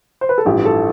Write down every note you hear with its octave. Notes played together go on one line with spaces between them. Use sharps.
C5
B4
A4
A1 G2 F3 G4
A4